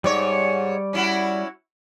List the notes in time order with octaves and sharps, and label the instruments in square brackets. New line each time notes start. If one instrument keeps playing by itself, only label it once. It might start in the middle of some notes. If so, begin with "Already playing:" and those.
[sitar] G#2 C#5 [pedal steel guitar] G3 D5 C#6
[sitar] C#4 E4 F#4